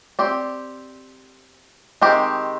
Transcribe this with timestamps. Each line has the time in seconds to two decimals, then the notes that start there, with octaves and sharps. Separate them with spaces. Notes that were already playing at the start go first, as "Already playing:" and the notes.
0.19 C4 G4 D5
2.02 D#3 G#3 C4 G4